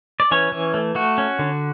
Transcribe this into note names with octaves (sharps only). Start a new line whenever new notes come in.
D5
E3 C#4 C#5
E3
A3
A3 F#4
C#4
D3